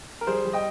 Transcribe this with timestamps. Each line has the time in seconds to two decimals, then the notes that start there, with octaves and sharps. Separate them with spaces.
0.21 A#4
0.27 G3 G#4 C5
0.44 G3
0.53 D#5 G5